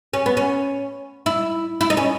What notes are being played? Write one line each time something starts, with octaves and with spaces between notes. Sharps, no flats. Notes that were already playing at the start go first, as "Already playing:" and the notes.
C#4
B3
C#4
E4
E4
D#4
C#4